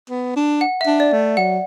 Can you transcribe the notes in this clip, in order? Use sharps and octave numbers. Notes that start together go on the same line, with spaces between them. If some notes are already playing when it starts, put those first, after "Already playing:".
B3
D4
F#5
E5
D4
D5
A3
F#3 F#5